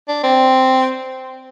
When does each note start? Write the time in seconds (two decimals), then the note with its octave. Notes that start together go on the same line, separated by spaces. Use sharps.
0.08 D4
0.23 C4